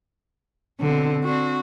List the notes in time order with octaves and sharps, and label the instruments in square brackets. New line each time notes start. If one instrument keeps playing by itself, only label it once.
[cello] B2 C4 [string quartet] D3
[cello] C4 D4 [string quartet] F#4